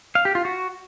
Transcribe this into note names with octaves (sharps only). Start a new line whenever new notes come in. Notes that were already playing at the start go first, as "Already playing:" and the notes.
F5
G4
F4
F#4